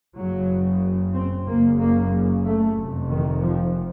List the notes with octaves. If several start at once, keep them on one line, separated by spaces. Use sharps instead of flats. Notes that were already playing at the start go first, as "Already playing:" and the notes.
F#1 F#2 C#3 F#3
C4
F#1 F#2 C#3 A#3
A#3
A3
F1 F2 C3
D#3
F3